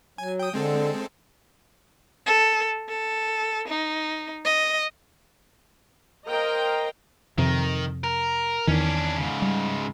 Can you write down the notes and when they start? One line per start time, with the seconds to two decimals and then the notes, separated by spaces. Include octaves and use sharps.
0.18 F#3 G#5
0.39 G5 D#6
0.54 D3 G#3 C4 A4
2.27 A4
2.89 A4
3.68 D#4
4.45 D#5
6.28 A#4 C5 D#5 F5 G5 A#5
7.38 F2 C3 D#3
8.04 A#4
8.67 E2 D#3 C#4 D4
9.17 G#2 C#3
9.42 G3